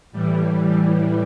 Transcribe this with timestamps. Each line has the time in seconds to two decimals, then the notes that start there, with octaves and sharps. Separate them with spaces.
0.12 A2 E3 G3